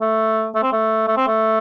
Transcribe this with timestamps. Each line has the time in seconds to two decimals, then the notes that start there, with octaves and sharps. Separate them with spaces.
0.02 A3
0.55 A3
0.63 C4
0.72 A3
1.08 A3
1.17 C4
1.28 A3